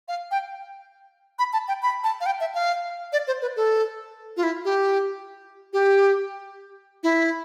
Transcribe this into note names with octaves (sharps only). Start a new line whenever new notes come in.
F5
G5
B5
A5
G5
B5
A5
F5
G5
E5
F5
D5
C5
B4
A4
F4
E4
G4
G4
E4